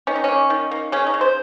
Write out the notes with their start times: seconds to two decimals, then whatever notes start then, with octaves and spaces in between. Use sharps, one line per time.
0.07 D#3 C#4
0.16 D#4
0.24 A#3 C#4
0.50 D#3
0.71 A#3
0.92 C#3 C#4
1.07 D#4
1.14 C#3
1.21 C5